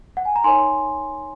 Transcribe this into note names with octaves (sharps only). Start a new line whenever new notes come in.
F#5
G#5
A#5
D#4 A#4 C#5 G#5 C6